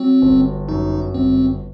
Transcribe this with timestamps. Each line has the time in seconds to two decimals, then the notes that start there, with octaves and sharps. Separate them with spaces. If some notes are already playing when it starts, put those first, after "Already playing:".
Already playing: F#3 C4
0.22 G1
0.69 F#2 D#4
1.14 G1 C4